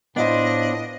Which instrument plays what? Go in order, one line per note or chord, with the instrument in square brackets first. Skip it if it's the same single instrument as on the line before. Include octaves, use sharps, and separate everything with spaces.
[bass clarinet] A2 [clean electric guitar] B3 F4 C5 [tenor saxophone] D4 [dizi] D#5